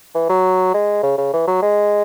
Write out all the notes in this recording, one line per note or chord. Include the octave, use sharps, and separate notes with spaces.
E3
F#3
G#3
C#3
C#3
E3
F#3
G#3